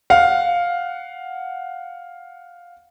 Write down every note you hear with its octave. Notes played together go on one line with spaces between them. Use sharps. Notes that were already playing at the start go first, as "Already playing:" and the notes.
F5 F#5